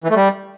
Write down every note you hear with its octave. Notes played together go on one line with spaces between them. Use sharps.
E3
A3
G3